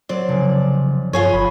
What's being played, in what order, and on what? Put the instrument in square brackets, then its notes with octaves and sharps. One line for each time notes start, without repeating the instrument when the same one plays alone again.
[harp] F#3 [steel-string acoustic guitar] C4 D5
[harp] F1 [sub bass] C#3
[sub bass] G2 [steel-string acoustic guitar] F4 G#4 C#5
[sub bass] G1 [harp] B5